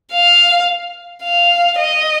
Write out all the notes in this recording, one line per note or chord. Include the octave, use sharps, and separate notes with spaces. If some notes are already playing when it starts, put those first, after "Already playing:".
F5
F5
D#5